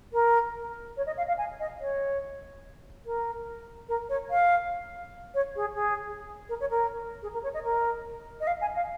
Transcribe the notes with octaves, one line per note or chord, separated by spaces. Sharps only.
A#4
C#5
D#5
F5
F5
G#5
D#5
C#5
A#4
A#4
C#5
F5
C#5
G#4
G#4
A#4
C#5
A#4
G#4
A#4
C#5
D#5
A#4
D#5
F5
G#5
F5